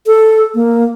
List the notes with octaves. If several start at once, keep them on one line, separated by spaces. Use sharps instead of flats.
A4
A#3